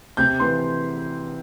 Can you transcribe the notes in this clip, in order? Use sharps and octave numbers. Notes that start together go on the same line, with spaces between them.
C3 G6
E3 C6